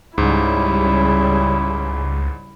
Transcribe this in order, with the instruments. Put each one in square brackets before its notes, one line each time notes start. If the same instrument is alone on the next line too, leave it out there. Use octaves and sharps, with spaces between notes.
[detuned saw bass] C#2 [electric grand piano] G#2 [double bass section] C#3 G3 [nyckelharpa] E4